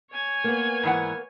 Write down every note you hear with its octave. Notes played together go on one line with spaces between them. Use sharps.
C#5 G#5
A#3 B3
G#2 E3 F#5